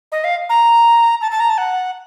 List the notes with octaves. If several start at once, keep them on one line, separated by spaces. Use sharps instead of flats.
D#5
F5
A#5
A5
A5
A#5
A5
F#5